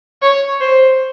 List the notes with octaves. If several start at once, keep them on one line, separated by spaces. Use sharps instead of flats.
C#5
C5